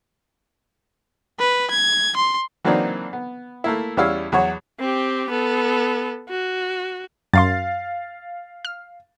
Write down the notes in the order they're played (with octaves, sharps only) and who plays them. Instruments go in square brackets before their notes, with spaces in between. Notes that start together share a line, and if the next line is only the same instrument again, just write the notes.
[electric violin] B4
G#6
C6
[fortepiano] E3 F#3 A#3 C4 D4 D#4
B3
A3 A#3 E4
E2 G3 C#4 E4 F5 E6
E2 F#3 F#4 C#5
[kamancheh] C4 G4
B3 A4
F#4
[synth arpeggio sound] F#2 C6 [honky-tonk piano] F5 A6
[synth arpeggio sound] F6